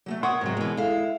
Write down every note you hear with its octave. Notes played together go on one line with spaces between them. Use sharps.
F#3 G#3 A3
A#4 C#5 F#5 C6 C#6 D#6
G#2 C3 F#3 G#3
B2 E3
E4 A4 F5